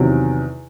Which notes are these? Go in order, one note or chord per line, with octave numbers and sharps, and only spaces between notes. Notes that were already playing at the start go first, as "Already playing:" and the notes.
Already playing: E2 C3 D#3 F#3